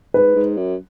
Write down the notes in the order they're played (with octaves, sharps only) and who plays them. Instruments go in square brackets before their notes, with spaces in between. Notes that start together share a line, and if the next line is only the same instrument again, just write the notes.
[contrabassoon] G#2 [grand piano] B4
[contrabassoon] G#2
F#2